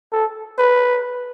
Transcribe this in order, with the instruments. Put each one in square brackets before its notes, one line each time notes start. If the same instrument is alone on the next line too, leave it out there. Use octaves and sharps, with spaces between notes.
[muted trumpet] A4
B4